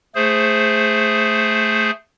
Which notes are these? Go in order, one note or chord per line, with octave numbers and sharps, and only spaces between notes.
A3 G#4 C5